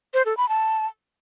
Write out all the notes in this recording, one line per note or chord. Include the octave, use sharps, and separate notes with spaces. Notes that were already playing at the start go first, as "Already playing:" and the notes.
C5
A4
B5
A5